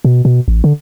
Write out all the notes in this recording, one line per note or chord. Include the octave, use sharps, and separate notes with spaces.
B2
B2
A1
D3